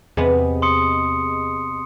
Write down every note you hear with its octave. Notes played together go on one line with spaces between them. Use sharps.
E2 C3 B3 G#4 D#5
C6 D#6 C#7